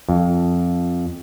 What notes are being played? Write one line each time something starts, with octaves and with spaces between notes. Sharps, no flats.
F2